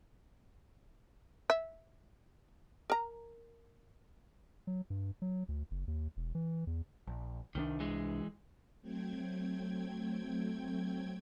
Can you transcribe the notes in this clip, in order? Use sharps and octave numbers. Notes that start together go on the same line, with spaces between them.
E5
A#4 A#5
F#3
G2
F#3
D2
F#1
D#2
E1
E3
E2
A#1
C2 D#3 G3 D4
E3 G#3
F#3 A3 C4 G5 G#6